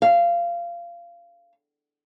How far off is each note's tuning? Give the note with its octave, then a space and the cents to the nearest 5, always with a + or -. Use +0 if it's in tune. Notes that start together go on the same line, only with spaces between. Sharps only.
F5 -20